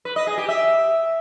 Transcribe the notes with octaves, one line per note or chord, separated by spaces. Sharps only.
B4
D#5
G#4
G4
E5